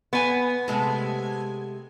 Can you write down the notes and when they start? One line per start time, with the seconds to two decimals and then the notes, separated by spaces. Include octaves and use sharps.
0.13 B3 G#5
0.68 C3 G#3 A4